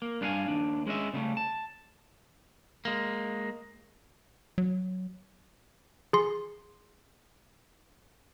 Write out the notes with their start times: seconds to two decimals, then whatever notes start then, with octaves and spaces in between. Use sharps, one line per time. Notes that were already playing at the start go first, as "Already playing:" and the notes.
0.02 A#3
0.21 G2 D4 G4 A#4 F5 G#5
0.48 D#2 D4
0.86 G#3 C#4 D#5 E5
1.13 C#3 G3 A3 C#4
1.37 A5
2.85 G#3 A#3
4.58 F#3
6.13 G#4 C6